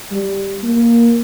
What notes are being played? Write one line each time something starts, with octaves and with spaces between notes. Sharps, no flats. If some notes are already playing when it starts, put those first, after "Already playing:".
G3
A#3